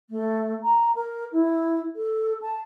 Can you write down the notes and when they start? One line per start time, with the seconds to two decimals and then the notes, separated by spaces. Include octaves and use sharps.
0.09 A3
0.63 A#5
0.95 A#4
1.32 E4
1.95 A4
2.41 A5